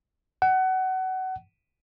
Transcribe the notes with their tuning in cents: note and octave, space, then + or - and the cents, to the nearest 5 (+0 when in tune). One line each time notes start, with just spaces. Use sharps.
F#5 +25